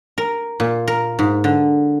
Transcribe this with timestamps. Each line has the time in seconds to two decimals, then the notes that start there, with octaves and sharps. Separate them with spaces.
0.18 A#4
0.60 A#2
0.88 A#4
1.19 G#2
1.44 D3